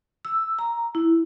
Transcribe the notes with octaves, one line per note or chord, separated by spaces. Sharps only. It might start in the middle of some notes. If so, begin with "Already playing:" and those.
E6
A#5
E4